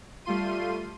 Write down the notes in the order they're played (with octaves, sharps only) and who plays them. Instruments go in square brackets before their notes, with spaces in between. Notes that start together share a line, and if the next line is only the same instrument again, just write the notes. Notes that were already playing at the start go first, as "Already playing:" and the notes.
[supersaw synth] G3 A3 F4 C6 D#7